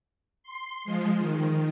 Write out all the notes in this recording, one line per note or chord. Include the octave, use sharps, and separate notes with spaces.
C6
F3 G#3
D#3